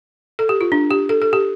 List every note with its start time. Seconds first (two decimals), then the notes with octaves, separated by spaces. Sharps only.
0.39 A4
0.49 G4
0.61 F4
0.72 D4
0.91 G4
1.09 A4
1.22 A4
1.33 G4